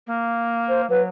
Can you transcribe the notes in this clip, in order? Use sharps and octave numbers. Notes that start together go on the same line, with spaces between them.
A#3
C5
F#3 B4